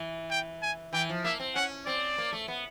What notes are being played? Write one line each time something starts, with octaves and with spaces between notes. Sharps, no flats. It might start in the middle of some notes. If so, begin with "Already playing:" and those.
Already playing: E3
G5
G#5
E3 G5
F3
A#3 E5
C4
C#4 F#5
C4 D5
A#3
A3
B3